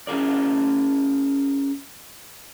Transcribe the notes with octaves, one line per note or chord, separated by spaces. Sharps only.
C#4 E4 G#4 A#4 D5